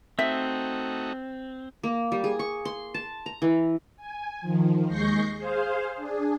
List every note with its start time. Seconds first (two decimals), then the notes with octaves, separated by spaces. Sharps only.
0.19 A3 C4 D#4 F#4 E5
1.83 A#3
2.12 G3
2.24 G#4
2.39 C#6
2.65 C6
2.94 A5
3.26 A#5
3.42 E3
3.97 G#5
4.41 D#3 F3
4.87 D#2 G#3 C#6 G6 A#6 C7
5.36 G#4 C5 F5
5.96 D4 G#4